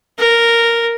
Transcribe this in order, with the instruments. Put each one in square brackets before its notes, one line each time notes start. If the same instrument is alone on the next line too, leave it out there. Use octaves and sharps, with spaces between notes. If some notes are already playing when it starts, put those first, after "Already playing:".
[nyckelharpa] A#4